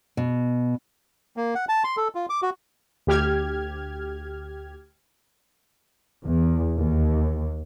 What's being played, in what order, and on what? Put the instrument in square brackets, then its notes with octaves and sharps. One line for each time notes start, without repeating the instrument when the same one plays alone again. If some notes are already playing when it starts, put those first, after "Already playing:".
[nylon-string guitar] B2
[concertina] A#3
F#5
A5
C6
A4
F4
D6
F#4
[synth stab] D2 G4 F6 G#6
[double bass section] E2
D#2